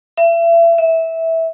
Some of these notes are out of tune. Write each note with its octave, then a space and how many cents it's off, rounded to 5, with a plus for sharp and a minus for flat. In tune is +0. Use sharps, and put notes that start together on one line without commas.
E5 +35
E5 -15